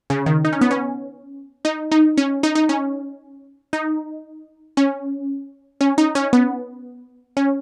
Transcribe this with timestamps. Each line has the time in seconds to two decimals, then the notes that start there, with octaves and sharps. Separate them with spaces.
0.10 C#3
0.26 D#3
0.45 D#4
0.53 C#4
0.61 B3
0.71 C#4
1.65 D#4
1.92 D#4
2.18 C#4
2.43 D#4
2.55 D#4
2.69 C#4
3.73 D#4
4.77 C#4
5.81 C#4
5.98 D#4
6.15 C#4
6.33 B3
7.37 C#4